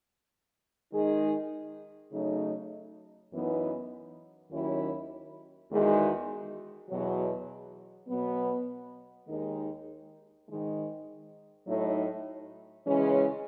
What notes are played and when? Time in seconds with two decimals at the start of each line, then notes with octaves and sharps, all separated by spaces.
0.93 D#3 G#3 D#4 G#4
2.12 C#3 F#3 A3 D#4
3.31 F#2 E3 B3 D#4
4.51 D#2 D#3 F#3 C#4 E4
5.70 E2 D#3 G#3 D#4 F#4
6.90 E2 B2 F#3
8.09 B2 F#3 B3
9.28 D#2 D#3 G#3 D#4
10.47 G#2 D#3 G#3
11.67 A2 F#3 A3 D#4
12.87 C#3 E3 G#3 C#4